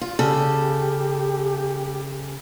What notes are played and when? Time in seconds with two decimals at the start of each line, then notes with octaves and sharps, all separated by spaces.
0.01 F4
0.19 C#3 G4 A4